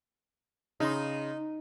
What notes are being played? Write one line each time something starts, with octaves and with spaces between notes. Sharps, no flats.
C#3 D#4 C6